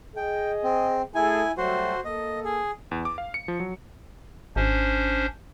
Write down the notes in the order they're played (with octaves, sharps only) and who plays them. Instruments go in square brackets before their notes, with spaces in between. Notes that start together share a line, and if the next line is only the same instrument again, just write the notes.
[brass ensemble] G#4 D#5 [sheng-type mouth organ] G5
[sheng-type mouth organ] C4
[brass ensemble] A3 G#4 A4 [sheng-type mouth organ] E4 G#5
[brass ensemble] F#3 G3 A3 [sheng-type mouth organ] F#4 C5
[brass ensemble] A#3 A4 [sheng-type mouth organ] D#5
[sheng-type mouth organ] G#4
[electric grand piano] E2
D6
F5
C#7
F3
F#3
[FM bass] G#1 [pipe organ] C#4 D4 C5